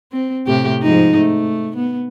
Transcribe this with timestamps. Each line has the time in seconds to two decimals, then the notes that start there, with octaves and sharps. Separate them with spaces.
0.13 C4
0.47 A2 C3 G4
0.82 G#2 F3 D#4
1.18 A3
1.76 B3